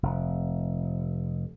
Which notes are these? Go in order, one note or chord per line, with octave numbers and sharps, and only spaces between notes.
F1